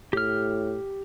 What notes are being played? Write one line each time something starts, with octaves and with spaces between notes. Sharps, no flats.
A2 G4 F6